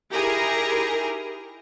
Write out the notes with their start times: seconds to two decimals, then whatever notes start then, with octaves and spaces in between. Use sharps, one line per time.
0.12 D#4 E4 G4 G#4 A#4 A#5